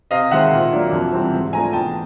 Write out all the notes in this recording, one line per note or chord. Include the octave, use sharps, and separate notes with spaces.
C3 D#5 F5
D#3 G#3 C4 E5 F#5
A#2
F#3 A#3 D4
F2
C3 E3 G3 C4
G#2
F3 A3 D4 G#5 A#5
E2 G5 A5